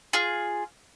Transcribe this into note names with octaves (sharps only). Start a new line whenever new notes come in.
F4 G#4